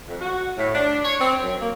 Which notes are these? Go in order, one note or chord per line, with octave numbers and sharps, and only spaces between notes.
F2
F#4
A2
D4
C#5
C4
F#2
A#3